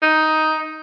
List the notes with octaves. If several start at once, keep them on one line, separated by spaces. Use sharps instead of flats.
D#4